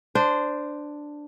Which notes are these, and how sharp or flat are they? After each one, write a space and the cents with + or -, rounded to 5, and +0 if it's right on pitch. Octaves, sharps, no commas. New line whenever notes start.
D4 +5 C5 -10